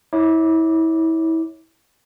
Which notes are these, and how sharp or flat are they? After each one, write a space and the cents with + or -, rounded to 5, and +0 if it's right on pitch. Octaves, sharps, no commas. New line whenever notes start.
E4 -30 C#5 +0 D6 -10